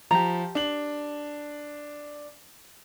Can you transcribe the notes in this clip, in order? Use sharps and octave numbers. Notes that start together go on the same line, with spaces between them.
F3 G4 A#5
D4 F#7